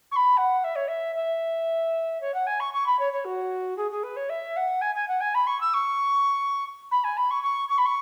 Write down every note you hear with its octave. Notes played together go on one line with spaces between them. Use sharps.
C#6
B5
F#5
E5
C#5
E5
E5
C#5
F#5
G#5
C#6
C#6
B5
C#5
C#5
F#4
G#4
G#4
B4
C#5
E5
F#5
G#5
G#5
F#5
G#5
B5
C#6
E6
C#6
B5
G#5
B5
C#6
C#6
C#6
B5
C#6